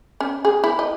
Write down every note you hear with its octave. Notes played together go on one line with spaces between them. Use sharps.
C#4
G#4
E4
D#5